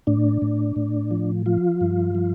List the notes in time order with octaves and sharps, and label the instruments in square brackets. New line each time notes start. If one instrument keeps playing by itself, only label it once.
[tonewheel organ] A2 D4
A2
A2
F3
F3 F4
G2
F3